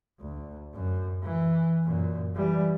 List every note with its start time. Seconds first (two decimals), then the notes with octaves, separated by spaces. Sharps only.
0.21 D2
0.74 F#2
1.23 E3
1.85 F#2 A#2
2.35 E3 G3